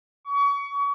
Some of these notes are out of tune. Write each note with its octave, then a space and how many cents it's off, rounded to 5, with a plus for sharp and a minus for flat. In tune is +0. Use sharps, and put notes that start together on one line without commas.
C#6 +30